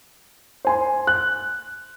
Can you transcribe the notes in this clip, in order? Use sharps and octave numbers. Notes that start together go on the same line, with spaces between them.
C5 G#5 C6
F#6